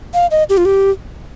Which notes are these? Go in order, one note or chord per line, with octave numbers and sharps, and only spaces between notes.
F5
D#5
G4
F4
G4